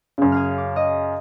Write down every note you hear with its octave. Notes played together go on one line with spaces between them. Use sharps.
F#2 C#3
G#4 F5 F6
D6
D#5